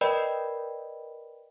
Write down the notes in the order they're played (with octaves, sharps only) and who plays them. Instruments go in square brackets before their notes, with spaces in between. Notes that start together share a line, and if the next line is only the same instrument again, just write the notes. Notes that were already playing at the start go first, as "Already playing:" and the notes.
[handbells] A#4 B4 D5 D#5 G5 B5